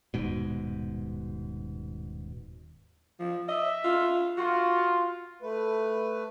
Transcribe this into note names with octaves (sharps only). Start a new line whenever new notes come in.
D#1 G#2 B2
F3
D#5 E5
F4
F4 F#4
A3 B4